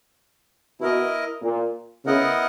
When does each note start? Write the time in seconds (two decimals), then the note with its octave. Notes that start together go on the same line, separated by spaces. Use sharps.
0.81 B2 E4 A#4 D#5
1.43 A#2
2.05 C#3 B3 E4 A#4 D#5 F#5